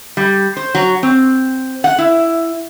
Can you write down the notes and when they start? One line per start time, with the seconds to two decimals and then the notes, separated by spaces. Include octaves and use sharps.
0.17 G3
0.57 C5
0.75 F#3
1.03 C4
1.84 F#5
1.98 E4